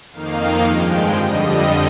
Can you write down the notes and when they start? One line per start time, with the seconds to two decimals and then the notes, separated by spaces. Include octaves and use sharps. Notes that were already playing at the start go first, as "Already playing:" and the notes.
0.12 F2 D#3 A#3 D#4 F5
0.62 G2 F3 G#3 G5
1.11 F2 D3 G3 D#5